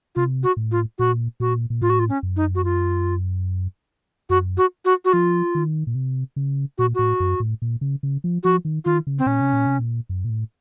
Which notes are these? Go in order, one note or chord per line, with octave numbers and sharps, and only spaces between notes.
C3 F4
F#4
A2
F4
A#2 F#4
A#2 F#4
A#2
A2 F4
F#4
F4
C#4
F#2
D#4
F#4
F4
F#2 F#4
F#4
F#4
F#4
F3 F4
D#3
A#2
C3
C#3
A#2 F#4
A2 F#4
F#2
A2
A#2
C#3
C#3
F3
F3 F#4
D#3
D#3 F4
C#3
C4
A#2 C#4
C3
A#2
C3
A#2
F#2
A#2
A2